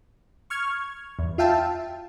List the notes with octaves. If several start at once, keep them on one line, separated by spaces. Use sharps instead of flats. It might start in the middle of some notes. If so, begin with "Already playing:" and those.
C#6 F6 G#6
E2
F4 E5 F5 G5 A5